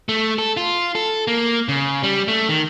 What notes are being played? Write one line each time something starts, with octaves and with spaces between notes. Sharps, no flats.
A3
A4
F4
A4
A#3
C#3
G3
A3
D#3